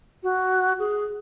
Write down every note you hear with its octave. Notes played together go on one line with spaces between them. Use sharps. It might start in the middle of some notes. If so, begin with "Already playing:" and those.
F#4
G#4